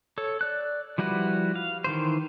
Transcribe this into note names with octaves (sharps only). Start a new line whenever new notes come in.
A4 C#5
D5 F#6
F3 G3 E4 F#4 B4
F5
D#3 E3 C5